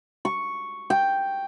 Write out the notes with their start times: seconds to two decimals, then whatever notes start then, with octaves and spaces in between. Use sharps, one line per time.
0.25 C#6
0.90 G5